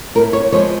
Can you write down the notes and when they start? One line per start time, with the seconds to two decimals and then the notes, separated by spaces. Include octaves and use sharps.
0.15 A2 A#4
0.33 C#5
0.52 F3 G#3 B3 C#5